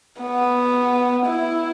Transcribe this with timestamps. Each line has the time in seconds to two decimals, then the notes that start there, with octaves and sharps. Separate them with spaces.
0.21 B3
1.26 E4